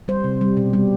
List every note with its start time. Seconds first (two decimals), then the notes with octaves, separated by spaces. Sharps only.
0.08 G3 C5
0.24 C3
0.41 G3
0.57 B2
0.73 G3